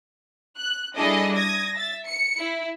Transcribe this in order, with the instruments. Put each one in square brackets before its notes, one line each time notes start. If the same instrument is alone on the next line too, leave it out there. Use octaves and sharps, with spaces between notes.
[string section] F#6
G3 D4 E4 G#4 A4 D#5
D#6 G#6 A#6
E5 A6
C#7
E4